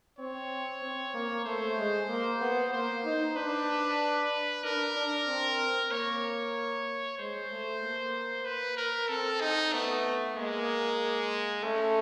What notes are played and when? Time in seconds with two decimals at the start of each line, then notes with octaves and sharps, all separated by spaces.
0.19 C4 C#5
0.82 C4
1.14 A#3
1.45 A3 C5
1.78 G#3
2.09 A#3
2.41 B3
2.73 A#3 C5
3.04 D#4
3.36 D4 B4
4.64 D4 A#4
4.96 D4
5.27 C4
5.91 A#3 C#5
7.18 G#3 C5
7.50 A3
7.82 A#3
8.45 B4
8.77 A#4
9.09 C4 A4
9.41 D#4
9.73 A3 B3
10.36 G#3 A#3
11.63 A3 C#4